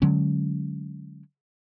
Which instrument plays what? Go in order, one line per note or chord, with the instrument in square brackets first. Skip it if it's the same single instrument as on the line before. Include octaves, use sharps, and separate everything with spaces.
[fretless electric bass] D3 F#3 G#3 C#4